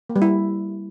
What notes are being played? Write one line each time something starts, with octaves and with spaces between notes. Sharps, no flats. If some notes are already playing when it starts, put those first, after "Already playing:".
A#3
G3
E4